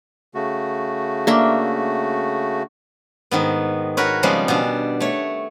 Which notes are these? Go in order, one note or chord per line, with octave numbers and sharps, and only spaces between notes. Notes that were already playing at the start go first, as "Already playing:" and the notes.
C#3 A3 F#4
A#3 D4 E5
G#2 D#3 B3
F#4 A#4 B4 C#5
C#3 F3 G3 G#3 B3 C4
B2 D4
A3 C#5